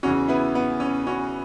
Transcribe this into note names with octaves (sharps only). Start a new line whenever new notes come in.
E2 C#3 E3 C#4 F#4
B3 E4
B3
C#4
C#4 F#4